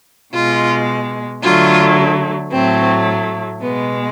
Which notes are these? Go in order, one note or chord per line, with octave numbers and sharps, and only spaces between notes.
B2 G#3 F4
D3 F#3 A3 F4
A2 F#3 A3 C4
B2 G#3 B3